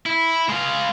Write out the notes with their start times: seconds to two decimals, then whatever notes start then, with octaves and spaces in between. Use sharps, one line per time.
0.06 E4
0.50 G#3 F5